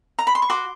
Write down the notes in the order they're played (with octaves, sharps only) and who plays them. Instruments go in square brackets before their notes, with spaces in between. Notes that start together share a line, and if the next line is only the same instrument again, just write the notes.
[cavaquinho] A#5
B5
C6
C#6
F#4 C6 D6